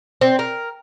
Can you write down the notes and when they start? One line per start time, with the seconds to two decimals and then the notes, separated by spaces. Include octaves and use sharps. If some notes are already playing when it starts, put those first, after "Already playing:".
0.21 C4
0.39 A#4